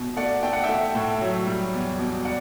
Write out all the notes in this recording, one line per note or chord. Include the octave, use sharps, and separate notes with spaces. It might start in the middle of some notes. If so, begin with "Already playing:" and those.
Already playing: B2
A3 D5 F#5
A3 G5
F#5
E5 G5
A3
A2
F#3
G3
E2
B2
D5 F#5